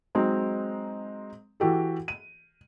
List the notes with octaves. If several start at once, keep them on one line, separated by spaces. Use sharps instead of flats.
F#3 G#3 C4 D#4
E3 F#4 G4 A4
D#7